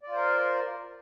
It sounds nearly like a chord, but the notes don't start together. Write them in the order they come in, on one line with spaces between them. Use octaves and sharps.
D5 F4 C5 A#4